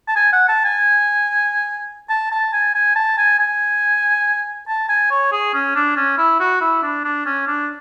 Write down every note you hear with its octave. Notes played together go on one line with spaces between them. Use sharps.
A5
G#5
F#5
A5
G#5
A5
A5
G#5
G#5
A5
G#5
G#5
A5
G#5
C#5
G#4
C#4
D4
C#4
E4
F#4
E4
D4
D4
C#4
D4